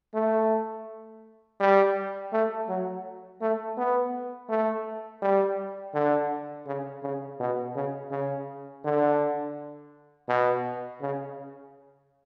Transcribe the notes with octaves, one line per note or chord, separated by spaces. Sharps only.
A3
G3
A3
F#3
A3
B3
A3
G3
D3
C#3
C#3
B2
C#3
C#3
D3
B2
C#3